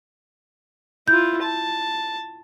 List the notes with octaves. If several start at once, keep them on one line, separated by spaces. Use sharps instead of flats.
E4 F4 G6
A5